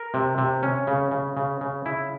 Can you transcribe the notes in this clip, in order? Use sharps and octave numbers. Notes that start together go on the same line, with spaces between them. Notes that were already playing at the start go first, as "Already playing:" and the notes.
Already playing: A#4
C3
C3
C#4
C#3
C#3
C#3
C#3
C#3 E4